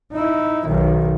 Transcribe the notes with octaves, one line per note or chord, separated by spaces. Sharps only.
D#4 E4
B1 D#3